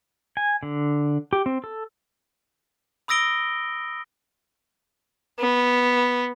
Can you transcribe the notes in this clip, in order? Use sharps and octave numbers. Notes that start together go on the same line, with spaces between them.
G#5
D3
G4
C4
A4
B5 D#6 E6 A#6 D7 G7
B3